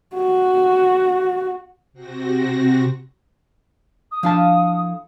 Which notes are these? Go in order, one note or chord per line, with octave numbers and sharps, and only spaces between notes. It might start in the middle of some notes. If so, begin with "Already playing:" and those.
F#4
C3 C4 F#4 A#6
D#6
F3 D4 E4 A4 F5 A5